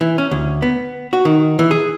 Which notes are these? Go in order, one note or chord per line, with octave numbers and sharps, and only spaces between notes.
E3
C#4
D2
B3
F#4
D#3
E3
G#4